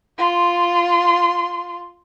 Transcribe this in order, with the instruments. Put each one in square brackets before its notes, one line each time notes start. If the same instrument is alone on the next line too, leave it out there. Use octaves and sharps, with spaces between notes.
[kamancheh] F4 C6